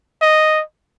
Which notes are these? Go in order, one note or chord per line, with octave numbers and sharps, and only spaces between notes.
D#5